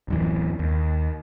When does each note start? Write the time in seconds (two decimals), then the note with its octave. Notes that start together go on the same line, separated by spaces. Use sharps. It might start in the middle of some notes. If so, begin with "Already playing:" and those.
0.08 D1 F#2 E3
0.59 D#2